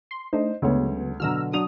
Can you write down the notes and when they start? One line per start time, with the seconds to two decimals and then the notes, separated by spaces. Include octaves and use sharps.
0.11 C6
0.33 A3 D4 D#4 C5 D#5
0.62 D2 C#3 F#3 G#3 B3 C#5
1.20 B2 D3 F#3 A#5 E6 F6
1.53 F#3 D4 D#6 F7